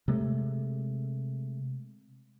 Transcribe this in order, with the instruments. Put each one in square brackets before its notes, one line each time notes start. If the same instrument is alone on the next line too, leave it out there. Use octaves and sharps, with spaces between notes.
[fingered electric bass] C3 G#3 A3